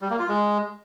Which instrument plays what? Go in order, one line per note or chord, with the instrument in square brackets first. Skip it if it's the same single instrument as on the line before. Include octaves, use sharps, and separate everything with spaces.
[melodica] G3
A#3
F4
G#3